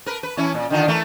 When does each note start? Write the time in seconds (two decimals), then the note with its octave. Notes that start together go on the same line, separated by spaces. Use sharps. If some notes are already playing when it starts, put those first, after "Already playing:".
0.06 A#4 B4
0.23 B4
0.37 E3 C#4 E4
0.54 A#2
0.70 D3 D#3 F4
0.88 E3 A3 A#4